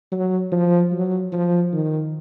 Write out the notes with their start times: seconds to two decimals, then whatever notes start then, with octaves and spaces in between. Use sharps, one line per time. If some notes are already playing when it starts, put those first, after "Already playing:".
0.12 F#3
0.52 F3
0.92 F#3
1.32 F3
1.73 D#3